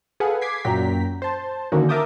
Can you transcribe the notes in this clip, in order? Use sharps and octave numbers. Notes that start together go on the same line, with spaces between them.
G#4 A4 B4 F5 F#5 G#5
D6 G#6 B6 C7
F#2 A#2 F#3 G5 A#5 B6
C5 A5
D3 D#3 A#3 C#4 D#4 F#4
A#4 E5 A5 D6 D#6 G6